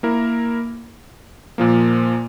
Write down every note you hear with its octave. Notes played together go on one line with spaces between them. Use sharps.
A#3 E4 A#4
A#2 F3 A#3